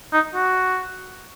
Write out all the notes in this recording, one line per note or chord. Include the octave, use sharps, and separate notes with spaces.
D#4
F#4